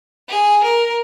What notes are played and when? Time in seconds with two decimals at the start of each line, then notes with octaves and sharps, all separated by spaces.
0.28 G#4
0.63 A#4